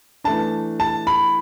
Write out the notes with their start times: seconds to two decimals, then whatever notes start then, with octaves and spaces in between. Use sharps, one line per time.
0.24 E3 A3 D4 A5
0.80 A5
1.07 B5